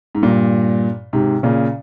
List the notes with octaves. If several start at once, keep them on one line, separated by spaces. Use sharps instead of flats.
G#2
G2 A#2
G#2 C3
A#2 C#3